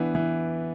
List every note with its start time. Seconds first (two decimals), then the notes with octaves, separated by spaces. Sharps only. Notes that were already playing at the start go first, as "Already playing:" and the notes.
Already playing: E3 B3 D4
0.15 E3